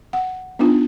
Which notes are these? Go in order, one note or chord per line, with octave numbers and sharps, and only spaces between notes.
F#5
B3 D4 D#4 F4